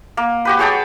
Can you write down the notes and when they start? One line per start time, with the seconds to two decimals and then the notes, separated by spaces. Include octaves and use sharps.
0.17 A#3
0.45 F#4 G4 B4
0.59 G#4 C#5 G5 A5